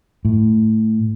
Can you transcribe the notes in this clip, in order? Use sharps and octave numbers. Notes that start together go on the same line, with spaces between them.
A2